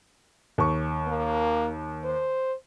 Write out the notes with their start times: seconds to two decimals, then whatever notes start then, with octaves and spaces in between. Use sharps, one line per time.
0.58 D#2 C#6
1.07 A#3
2.04 C5